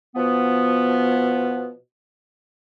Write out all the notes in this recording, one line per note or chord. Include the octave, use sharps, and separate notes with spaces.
B2 F3 B3